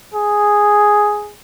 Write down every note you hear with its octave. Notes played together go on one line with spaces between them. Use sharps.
G#4